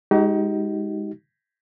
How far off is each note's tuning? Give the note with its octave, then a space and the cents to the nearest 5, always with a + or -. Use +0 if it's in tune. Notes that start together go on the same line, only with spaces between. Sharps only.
G#3 -20 D#4 +20 G4 -45